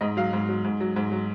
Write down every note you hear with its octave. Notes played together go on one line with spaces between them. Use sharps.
G#2 D#5
F#3 F5
G#2
F#3
G#2
F#3
G#2
F#3